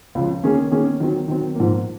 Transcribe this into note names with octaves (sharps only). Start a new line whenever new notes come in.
C#2 C#3 F3
D#3 A#3 C#4 G#4
D#3 A#3 C#4 G#4
D#3 F#3 C4
D#3 F#3 C4
G#2 F3 A#3